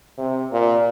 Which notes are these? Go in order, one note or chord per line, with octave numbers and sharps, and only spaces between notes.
C3
A#2